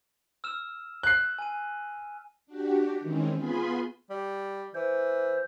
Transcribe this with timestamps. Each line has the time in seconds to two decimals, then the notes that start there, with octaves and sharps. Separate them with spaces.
0.44 E6 F6 E7
1.03 F#6 C7
1.39 G#5 D#7
2.46 D4 F#4 G4
3.00 D#3 E3 G#3 C4 C#4
3.35 B3 F4 G#4 G#5 B5 C6
4.10 G3
4.74 E3 C5